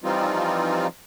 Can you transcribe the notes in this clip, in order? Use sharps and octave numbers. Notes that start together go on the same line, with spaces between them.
E3 F3 G3 C4 D#4 F4